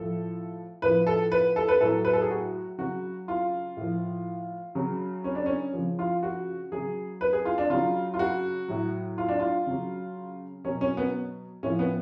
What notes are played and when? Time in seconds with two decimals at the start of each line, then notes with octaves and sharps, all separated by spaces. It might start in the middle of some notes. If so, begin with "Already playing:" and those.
Already playing: A2 F3 A4
0.82 A2 F3 B4
1.07 A4
1.32 B4
1.56 A4
1.69 B4
1.80 A2 F#3 A4
2.05 B4
2.13 A4
2.22 G#4
2.30 F#4
2.78 C#3 F#3 F#4
3.28 F4
3.77 A2 F3
4.75 C#3 F#3
5.24 C#4
5.35 D4
5.46 C#4
5.73 F3
5.78 C#3
5.99 F4
6.23 F#4
6.72 C#3 F#3 G#4
7.21 B4
7.33 G#4
7.45 F4
7.58 D4
7.70 C#3 F#3 F4
8.14 F4
8.19 F#4
8.68 A2 F#3
9.18 F4
9.28 D4
9.39 F4
9.67 C#3 F#3
10.65 B2 F#3 C#4
10.81 C#4
10.97 B3
11.63 A2 F3 C#4
11.79 B3